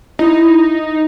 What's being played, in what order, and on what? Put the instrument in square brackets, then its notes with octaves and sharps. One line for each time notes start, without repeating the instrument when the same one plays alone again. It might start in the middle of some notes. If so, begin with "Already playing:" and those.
[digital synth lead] D#4 [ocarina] E4